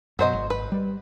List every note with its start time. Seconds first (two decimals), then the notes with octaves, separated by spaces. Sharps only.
0.19 F#2 B2 F#3 C5 D#5
0.33 G#1
0.50 B4
0.72 G3